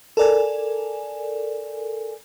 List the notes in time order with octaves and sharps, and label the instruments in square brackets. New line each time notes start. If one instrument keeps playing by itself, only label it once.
[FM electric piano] A4 A#4 D5 G#5